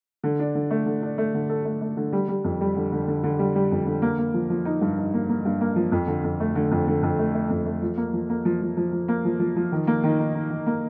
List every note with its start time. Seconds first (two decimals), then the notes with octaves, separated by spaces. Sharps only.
0.24 D3
0.39 D4
0.55 D3
0.71 A3
0.86 D3
1.02 D4
1.18 A3
1.34 D3
1.49 A4
1.65 A3
1.82 A3
1.97 D3
2.13 G3
2.28 G3
2.44 F2
2.61 G3
2.76 D3
2.92 D3
3.08 D3
3.24 D3
3.39 G3
3.55 G3
3.71 F2
3.86 D3
4.02 A#3
4.18 A#3
4.34 F3
4.50 F3
4.65 D#4
4.81 G2
4.97 D#4
5.14 A#3
5.29 A#3
5.45 G2
5.61 A#3
5.76 F3
5.92 F2
6.07 D3
6.24 F2
6.40 A3
6.55 D3
6.71 F2
6.87 D3
7.03 F2
7.19 A3
7.34 A3
7.50 F2
7.66 A3
7.82 F3
7.97 A#3
8.13 F3
8.29 A#3
8.45 F3
8.61 F3
8.77 F3
8.92 F3
9.08 A#3
9.25 F3
9.39 F3
9.56 F3
9.72 D#3
9.87 A#3
10.04 D#3
10.19 D#4
10.34 D#4
10.50 D#3
10.66 A#3